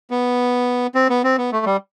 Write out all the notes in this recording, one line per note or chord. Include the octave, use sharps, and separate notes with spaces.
B3
C4
B3
C4
B3
A3
G3